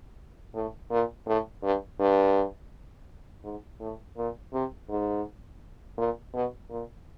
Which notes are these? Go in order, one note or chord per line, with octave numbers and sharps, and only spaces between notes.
A2
A#2
A2
G2
G2
G#2
A2
A#2
C3
G#2
A#2
B2
A#2